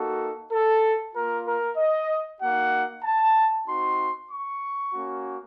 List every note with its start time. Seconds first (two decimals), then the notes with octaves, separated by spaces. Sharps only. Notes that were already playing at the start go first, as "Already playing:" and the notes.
Already playing: A#3 D#4 F#4 A4
0.51 A4
1.14 A#3 F4 A#4
1.46 A#4
1.77 D#5
2.41 A#3 D#4 F#4 F#5
3.04 A5
3.67 C4 D#4 F#4 C6
4.29 C#6
4.93 A#3 C#4 F#4